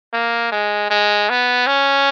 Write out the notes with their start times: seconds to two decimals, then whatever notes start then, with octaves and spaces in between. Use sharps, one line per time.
0.13 A#3
0.52 G#3
0.90 G#3
1.29 B3
1.67 C#4